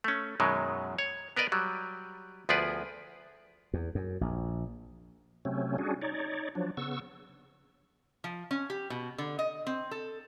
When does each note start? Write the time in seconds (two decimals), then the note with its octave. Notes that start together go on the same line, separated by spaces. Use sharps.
0.04 A3 C#4
0.40 F#2 B2 D#3 F#3 G#3
0.99 C#5
1.37 B3 A#4 B4 D5 D#5
1.52 F#3 G3
2.49 D2 F3 B3 G#4 B4 D5
3.74 E2
3.95 F#2
4.21 A#1
5.45 C3 F#3 A3 C4 C#4
5.78 G3 C#4 D4 F#4 G#4
6.02 D#4 C#5 D5
6.55 F3 F#3 D4
6.77 C#3 B3 C#6 E6
8.24 F3
8.51 C#4
8.70 G4
8.90 B2
9.18 D3
9.39 D#5
9.67 C4
9.91 A4